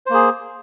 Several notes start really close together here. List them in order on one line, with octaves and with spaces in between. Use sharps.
C5 A#3 G#4